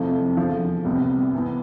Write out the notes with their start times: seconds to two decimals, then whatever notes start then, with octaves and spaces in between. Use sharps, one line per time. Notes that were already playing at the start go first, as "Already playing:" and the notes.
Already playing: F2 C3 F3 A3 E4
0.36 E2 D3 F3
0.85 C2 C3 G3 B3
1.33 C3 E3 B3